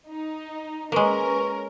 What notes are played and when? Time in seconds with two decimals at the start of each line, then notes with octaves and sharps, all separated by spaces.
0.10 D#4
0.92 G#3 A#3 C#4 A#4 B4 C#6